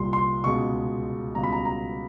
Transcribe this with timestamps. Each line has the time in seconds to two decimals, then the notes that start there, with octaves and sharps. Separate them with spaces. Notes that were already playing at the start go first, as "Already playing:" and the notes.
Already playing: C2 A#2 G3 C6
0.13 C6
0.44 C#2 B2 G#3 C#6
1.35 C#2 B2 G3 A#5
1.44 B5
1.53 A#5
1.65 A#5